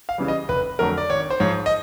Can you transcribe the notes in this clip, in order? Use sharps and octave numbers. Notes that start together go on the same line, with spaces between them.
F5
C#3 E3 G3
D#5
F1 B4
F2 D3 F#3 A3 A#4
D5
G#1 C#5
C5
G#2 F3 C#5
D#5